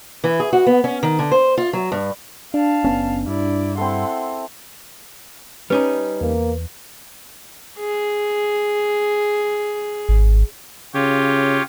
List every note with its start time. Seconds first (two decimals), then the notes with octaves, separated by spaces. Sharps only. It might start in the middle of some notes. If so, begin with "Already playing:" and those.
0.24 E3
0.40 G#4
0.53 F#4
0.66 B3
0.84 C#4
1.03 D#3
1.19 D3
1.31 C5
1.57 F4
1.73 F#3
1.92 G2
2.54 D4 F5 A5
2.84 F#1 B3 C#4
3.27 G2 E4 D5
3.78 C4 E4 A4 F#5 C6
5.70 G3 C#4 D#4 B4
6.21 E2 A#3
7.79 G#4
10.09 G#1
10.94 C#3 F4 G4 C#5